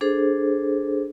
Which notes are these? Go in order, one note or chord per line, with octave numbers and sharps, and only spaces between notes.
D4 G#4 A4 C5